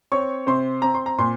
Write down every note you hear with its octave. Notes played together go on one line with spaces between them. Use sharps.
C4 C#5 C#6
C3 C5 C6
C4 A#5
C6
A#5
A#2 C6